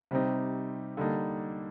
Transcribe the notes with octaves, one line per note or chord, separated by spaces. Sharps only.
C3 G3 C4 D#4
D3 G3 A#3 D#4